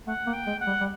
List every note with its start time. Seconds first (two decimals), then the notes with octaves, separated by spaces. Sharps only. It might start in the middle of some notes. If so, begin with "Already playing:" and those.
0.07 A3 F#5
0.26 A#3
0.33 G5
0.47 G#3
0.60 F#5
0.67 G3
0.81 G3